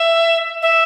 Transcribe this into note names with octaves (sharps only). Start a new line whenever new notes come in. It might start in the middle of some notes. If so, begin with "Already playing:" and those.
Already playing: E5
E5